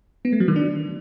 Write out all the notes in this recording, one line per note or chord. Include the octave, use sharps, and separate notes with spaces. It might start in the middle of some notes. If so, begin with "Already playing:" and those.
B3
A3
F#3
D#3
D4